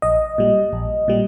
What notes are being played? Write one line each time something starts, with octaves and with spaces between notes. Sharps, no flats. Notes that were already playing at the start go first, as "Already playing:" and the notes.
A#1 D#5
A#2 G3
A#1
A#2 G3